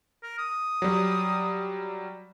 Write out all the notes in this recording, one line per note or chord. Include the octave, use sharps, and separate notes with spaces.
A#4
D#6
F#3 G3